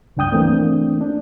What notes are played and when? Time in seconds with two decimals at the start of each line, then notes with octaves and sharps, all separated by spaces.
0.17 C#2 G2 D4 G5 D#6 G6
0.31 E3 A3 A#3 C4 D4
1.01 D4